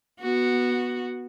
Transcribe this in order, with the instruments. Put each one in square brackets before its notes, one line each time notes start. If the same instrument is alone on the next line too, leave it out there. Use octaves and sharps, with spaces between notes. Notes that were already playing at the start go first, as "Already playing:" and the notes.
[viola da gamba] B3 F#4